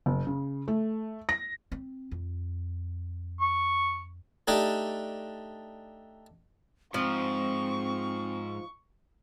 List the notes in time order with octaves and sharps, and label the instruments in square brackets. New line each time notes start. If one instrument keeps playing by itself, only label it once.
[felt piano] F#1
C#3
A3
A#6
[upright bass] C4
F2
[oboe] C#6
[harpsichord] A3 D4 D#4 G4
[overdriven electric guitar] G#2 [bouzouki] F3 [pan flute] C4 [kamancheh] C#6